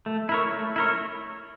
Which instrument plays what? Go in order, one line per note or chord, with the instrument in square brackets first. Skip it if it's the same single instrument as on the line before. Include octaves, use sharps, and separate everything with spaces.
[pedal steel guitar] A3
E4 A#4 C#5
A3
E4 A#4 C#5